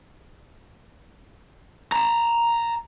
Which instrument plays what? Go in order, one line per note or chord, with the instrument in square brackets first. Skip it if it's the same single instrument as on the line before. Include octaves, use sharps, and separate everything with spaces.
[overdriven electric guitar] A5 A#5